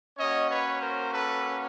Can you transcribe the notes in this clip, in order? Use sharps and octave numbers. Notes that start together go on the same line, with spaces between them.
A#3 C#4 F#4 C#5 D#5
B4 C#5
A#4 C5
A4 B4